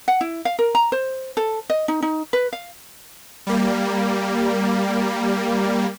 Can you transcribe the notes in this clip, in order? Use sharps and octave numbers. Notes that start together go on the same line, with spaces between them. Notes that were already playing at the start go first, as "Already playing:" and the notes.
F#5
E4
F5
A#4
A#5
C5
A4
D#5
D#4
D#4
B4
F5
G3 A#3